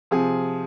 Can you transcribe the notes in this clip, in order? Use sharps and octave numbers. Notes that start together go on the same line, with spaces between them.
C3 F3 G#4